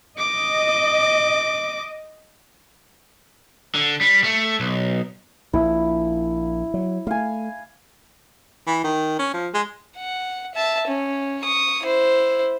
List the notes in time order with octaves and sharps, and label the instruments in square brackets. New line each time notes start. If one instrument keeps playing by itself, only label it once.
[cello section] D#5 [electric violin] D6
[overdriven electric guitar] D3
G3
A3
B1
[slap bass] A#1 A#2 [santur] E4
[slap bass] F#3
[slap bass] A3 [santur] F5 G#5
[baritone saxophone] E3
D#3
C#4
F3
G#3
[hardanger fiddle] F#5
E5 A5
C#4
C#6 D#6
E4 C5